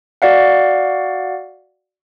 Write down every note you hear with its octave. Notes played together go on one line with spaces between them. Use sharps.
F#4 D5 F5 F#5